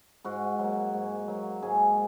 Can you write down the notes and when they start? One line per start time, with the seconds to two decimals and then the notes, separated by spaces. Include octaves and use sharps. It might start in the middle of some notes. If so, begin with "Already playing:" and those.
0.24 G#2 F#4
0.59 F#3
0.64 A#3
0.94 G#2
1.28 F#3 A#3
1.62 G#2 G#4